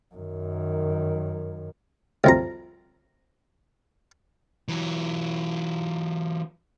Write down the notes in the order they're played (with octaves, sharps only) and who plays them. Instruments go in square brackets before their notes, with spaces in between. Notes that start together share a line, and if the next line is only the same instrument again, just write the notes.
[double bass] F#2 D#3
[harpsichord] C2 F2 A#5
[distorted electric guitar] E3 F#3